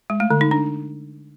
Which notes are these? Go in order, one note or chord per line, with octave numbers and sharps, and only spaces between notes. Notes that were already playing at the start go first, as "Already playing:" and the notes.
G#3
A3
D3
D#4
D4